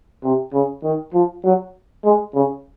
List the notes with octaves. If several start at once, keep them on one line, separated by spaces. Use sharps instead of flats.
C3
C#3
D#3
F3
F#3
G#3
C#3